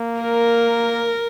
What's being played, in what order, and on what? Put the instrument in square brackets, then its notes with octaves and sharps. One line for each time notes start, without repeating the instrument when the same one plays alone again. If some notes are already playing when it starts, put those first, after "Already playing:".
Already playing: [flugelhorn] A#3
[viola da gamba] A#4